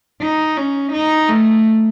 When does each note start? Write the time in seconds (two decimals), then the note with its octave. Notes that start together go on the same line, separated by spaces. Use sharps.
0.21 D#4
0.57 C#4
0.93 D#4
1.29 A3